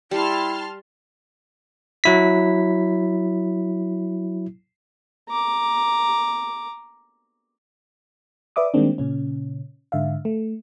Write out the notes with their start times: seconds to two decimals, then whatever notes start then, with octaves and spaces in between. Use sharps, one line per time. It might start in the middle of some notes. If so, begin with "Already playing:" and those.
0.11 G3 E4 A5 C6 F6
2.04 F#3 E4 B6
5.29 A#5 D6
8.56 B4 D5 E5 D6 D#6
8.74 D#3 G3 G#3 A#3 C4 D4
8.98 A#2 C#3 C#4
9.92 G#2 D3 E5 F5
10.25 A3